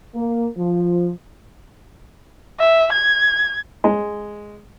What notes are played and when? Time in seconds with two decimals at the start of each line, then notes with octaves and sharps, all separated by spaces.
0.15 A#3
0.57 F3
2.60 E5
2.93 G#6
3.84 G#3